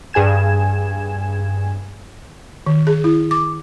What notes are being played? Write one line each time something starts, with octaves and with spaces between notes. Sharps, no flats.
G2 G#4 G#5 G#6 E7
D#3
G#4
E4
D6